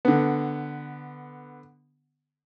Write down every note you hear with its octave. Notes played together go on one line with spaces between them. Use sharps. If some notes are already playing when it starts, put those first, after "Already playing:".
D3 B3